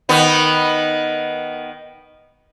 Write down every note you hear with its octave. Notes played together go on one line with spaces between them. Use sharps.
D#3 B3